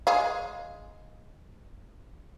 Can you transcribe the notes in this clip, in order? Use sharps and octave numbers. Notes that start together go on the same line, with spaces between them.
G#3 G#4 F5